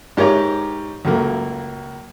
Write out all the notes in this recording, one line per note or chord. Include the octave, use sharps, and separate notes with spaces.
G#2 G4 A#4 C#5 A#5
C#2 F#2 A3 A#3